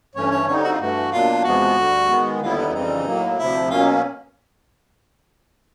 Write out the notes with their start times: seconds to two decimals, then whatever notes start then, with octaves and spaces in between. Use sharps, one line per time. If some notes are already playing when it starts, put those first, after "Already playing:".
0.15 G2 E3 A3 C#4 C#5
0.31 C#5
0.47 D3 G3 C4 D#4 C#5
0.56 G4
0.64 F#4
0.72 F4
0.80 G2 E3 A3 F#4
1.12 B2 F#3 A#3 D4 F4
1.44 E2 C3 F3 G#3 B3 F#4
1.76 D2 D3 G3
2.08 D#3 G#3 B3
2.41 D#2 D3 G3 B3 E4 F4
2.57 D#4
2.73 F2 C#3 E3 G3 C4 D#4
3.06 A2 F#3 A#3
3.38 D2 C3 F3 E4
3.70 B2 F#3 A#3 C#4 F4